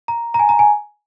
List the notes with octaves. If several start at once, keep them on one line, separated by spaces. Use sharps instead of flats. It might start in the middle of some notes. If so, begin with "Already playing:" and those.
A#5
A#5
G#5
A#5
G#5